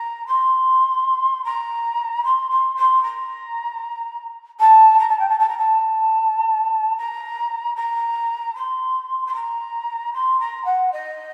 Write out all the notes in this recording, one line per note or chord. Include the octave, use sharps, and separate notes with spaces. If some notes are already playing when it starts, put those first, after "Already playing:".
Already playing: A#5
C6
A#5
C6
C6
C6
A#5
A5
A#5
A5
G5
A5
A5
A#5
A5
A#5
A#5
C6
C6
A#5
C6
A#5
F#5
D#5